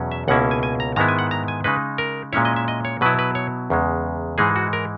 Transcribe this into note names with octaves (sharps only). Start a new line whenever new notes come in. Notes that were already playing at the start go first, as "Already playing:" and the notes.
Already playing: E2 B2 F#3 C#4
E5
C#2 B2 A#3 C#4 E4 F#5
G#5
G#5
A#5
G#2 D#3 G#3 B3 E4 A#5
G#5
F#5
A#5
G#5
C#3 G#3 D#4 B4
A#4
A#2 G#3 C#4 E4 C#5
D#5
E5
D#5
C#5
B2 F#3 B3 E4 B4
B4
C#5
E2 C#3 G#3
G#2 E3 G#3 D#4 G#4
F#4
A#4